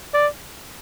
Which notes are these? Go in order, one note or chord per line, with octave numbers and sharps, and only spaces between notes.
D5